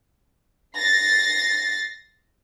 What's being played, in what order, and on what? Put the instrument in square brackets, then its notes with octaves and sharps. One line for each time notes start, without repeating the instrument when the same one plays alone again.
[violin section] A6 A#6 C7